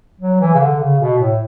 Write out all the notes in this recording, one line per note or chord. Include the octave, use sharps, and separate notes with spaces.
F#3
E3
C#3
D3
C#3
B2
A2